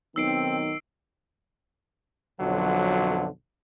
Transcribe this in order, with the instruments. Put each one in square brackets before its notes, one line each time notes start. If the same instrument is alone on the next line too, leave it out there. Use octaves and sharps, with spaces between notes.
[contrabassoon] B1 [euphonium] D#3 [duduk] C4 [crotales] E6 C7 D7
[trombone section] B1 F2 D3 F3 F#3